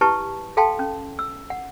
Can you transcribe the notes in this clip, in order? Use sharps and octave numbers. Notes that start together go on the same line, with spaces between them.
E4 G4 B4 A5 C#6
A4 F5 G5 A5 C6
C#4
E6
F#5